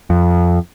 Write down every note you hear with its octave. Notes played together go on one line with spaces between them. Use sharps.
F2